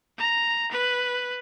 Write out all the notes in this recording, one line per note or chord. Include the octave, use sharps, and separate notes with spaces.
A#5
B4